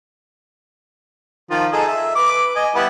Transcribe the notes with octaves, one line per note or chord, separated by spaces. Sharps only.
D#3 F3 F4
D#4 G#4 A4
E5
B4 D6
D#5 G#5
G3 B3 E4